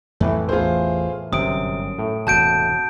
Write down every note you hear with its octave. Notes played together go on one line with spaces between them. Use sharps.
F2 A2 E3 A3 B3
A1 E2 F4 G#4 C5
G1 F#2 C3 D#6 D7
A2
E1 C3 F#4 A5 G6 D7